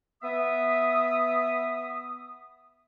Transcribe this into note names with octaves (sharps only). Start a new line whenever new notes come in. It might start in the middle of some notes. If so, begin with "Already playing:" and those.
B3 E5 D#6